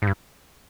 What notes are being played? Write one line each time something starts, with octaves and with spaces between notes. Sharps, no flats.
G#2
G2